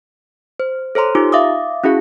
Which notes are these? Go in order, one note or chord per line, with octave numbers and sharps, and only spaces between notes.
C5
A4 C5 C#5 A#5 C6
D#4 F4 G4 D6
E5 F5 D6 D#6
C#4 E4 F#4 G#4 F5